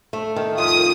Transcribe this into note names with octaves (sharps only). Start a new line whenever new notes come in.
A3
D#3
F2 D#6